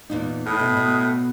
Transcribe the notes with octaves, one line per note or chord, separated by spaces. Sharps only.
E2 A#2 D#4
A2 B5 D#6 F#6
B2
B2